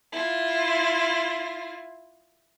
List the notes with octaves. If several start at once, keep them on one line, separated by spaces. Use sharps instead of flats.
E4 F4